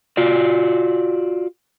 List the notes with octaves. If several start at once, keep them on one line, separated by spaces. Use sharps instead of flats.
F4 F#4 D5